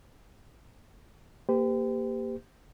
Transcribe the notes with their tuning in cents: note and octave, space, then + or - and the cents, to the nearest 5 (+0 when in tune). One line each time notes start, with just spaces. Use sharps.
A#3 +0 G4 +15 C5 -45